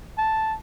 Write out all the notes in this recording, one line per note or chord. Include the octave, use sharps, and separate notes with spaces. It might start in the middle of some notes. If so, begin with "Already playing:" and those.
A5